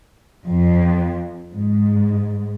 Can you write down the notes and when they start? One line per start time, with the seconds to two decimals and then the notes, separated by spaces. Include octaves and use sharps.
0.48 F2
1.53 G#2